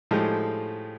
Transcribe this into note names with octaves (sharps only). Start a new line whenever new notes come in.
A2 F3 G#3 A3 D#4 G4